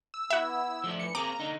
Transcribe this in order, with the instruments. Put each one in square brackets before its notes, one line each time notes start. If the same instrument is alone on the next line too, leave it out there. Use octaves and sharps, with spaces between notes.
[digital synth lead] E6
[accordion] B3 E4 [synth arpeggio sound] F#4 E5
[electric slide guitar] F3 A3 D4
[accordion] G2 E3 [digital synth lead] C#7
[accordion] A#3 [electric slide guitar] C4 G#4 [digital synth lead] A#5 [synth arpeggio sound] D6
[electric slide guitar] D3 D#4